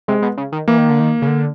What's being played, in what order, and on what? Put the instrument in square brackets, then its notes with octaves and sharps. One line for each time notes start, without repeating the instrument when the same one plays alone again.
[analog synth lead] C3 [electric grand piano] G#3
[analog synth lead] B2
C#3
D#3
[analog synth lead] E3 [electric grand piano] A#3
[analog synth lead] D#3
D3
D#3
C#3
D3